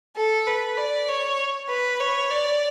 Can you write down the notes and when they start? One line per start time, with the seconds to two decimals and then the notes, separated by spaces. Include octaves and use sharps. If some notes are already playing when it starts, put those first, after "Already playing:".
0.16 A4
0.47 B4
0.78 D5
1.08 C#5
1.69 B4
2.00 C#5
2.30 D5